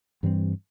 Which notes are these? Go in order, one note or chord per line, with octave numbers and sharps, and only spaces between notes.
G2 E3 G3 C4